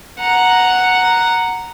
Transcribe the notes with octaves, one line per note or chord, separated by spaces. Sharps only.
F#5 A#5